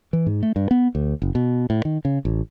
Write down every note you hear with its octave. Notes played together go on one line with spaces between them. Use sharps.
E3
G#2
A3
G2
B3
D2
F#1
B2
A2
D#3
C#3
A1